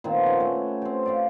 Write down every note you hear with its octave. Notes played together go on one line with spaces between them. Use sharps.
A#2 D#3 B3 C4
C#4 F#5 G#5
A3
C4 G4
F4 G4 B4 D5